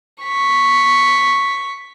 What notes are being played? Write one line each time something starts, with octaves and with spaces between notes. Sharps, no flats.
C#6 B6